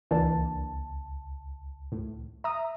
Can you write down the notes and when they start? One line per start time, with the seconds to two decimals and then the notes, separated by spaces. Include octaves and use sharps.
0.11 C#2 E3 A#3 D4 A5
1.92 A2
2.44 E5 A#5 D#6